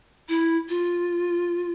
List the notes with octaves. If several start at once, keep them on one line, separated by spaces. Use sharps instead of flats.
E4
F4